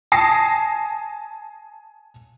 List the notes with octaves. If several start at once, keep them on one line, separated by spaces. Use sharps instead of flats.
G#5 A5 D#6 A#6 C7